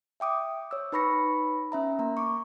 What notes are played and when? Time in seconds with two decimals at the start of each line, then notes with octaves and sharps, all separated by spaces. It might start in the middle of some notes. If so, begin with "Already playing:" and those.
0.20 E5 G5 D6 D#6
0.71 C#5 E6
0.92 D#4 B4 B5 C#6 A#6 C#7
1.72 C#4 E5 A#5
1.99 A#3 A#5
2.17 C#6 D6